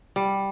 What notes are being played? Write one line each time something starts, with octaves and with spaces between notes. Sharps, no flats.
G3